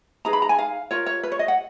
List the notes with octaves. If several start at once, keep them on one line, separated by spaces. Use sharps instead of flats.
D#4 G#4 B4 A#5
B5
A#5
G#5
F5
F4 A#4 C#5
C#5
B4
C#5
D#5
F#5